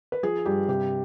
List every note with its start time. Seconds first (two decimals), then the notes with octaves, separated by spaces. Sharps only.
0.12 B4
0.23 F3 G#4
0.45 G2 G4
0.68 C3 G4